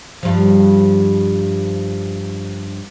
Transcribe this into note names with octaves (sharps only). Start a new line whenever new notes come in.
G2 F3